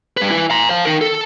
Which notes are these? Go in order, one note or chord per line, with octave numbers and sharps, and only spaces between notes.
G3 B4
E4 B4
A#5 C6
C5 F5
D#4 A#4
A4